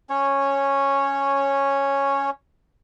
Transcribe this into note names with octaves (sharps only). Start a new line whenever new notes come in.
C#4 C#5